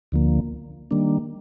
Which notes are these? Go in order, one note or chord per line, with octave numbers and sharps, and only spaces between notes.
D2 D3 F3 A#3
D#3 G3 A#3 D4